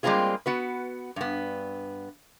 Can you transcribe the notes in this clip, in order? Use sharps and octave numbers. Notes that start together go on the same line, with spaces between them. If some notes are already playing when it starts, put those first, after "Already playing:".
G3 G#3 A#3 C4 F4 G#4
B3 F#4 B4
G2 B3